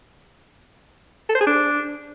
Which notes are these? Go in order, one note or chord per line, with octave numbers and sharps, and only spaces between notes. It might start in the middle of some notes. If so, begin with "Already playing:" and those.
A4
C5
G#4
D4